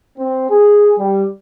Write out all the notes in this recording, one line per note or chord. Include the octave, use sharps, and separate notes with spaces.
C4
G#4
G3